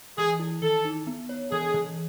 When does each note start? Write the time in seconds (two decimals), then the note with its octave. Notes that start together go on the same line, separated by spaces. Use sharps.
0.18 E3 G#4
0.39 E4
0.62 D#3 A4
0.85 D#4
1.07 B3
1.29 C#5
1.52 E3 G#4
1.74 E3